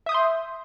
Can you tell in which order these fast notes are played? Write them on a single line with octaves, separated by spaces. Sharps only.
E5 D#6 G6 C6